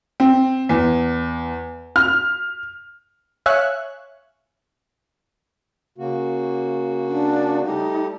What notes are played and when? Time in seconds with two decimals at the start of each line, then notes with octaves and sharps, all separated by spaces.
0.20 C4
0.69 E2
1.96 F6
3.46 C#5 E5 F5 G#5 C#6 F#6
5.98 C#3 A#3 F#4
7.08 D4
7.65 G3 A3 D#4 G4